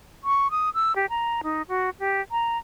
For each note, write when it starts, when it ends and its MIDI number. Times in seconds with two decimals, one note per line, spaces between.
0.24 0.50 85
0.51 0.69 87
0.74 0.95 88
0.96 1.06 67
1.10 1.41 82
1.44 1.62 63
1.69 1.90 66
2.00 2.21 67
2.31 2.58 82